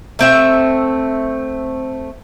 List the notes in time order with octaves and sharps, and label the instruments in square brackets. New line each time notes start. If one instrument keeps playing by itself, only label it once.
[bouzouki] A3 C4 E5